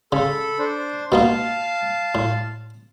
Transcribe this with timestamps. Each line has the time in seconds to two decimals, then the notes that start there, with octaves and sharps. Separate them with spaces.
0.12 C#3 A4 B5
0.59 D4 C5
1.12 B2 A#3 D#4 F5 A5
2.15 A2